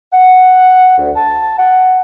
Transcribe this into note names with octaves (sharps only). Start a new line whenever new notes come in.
F#5
D2
A5
F#5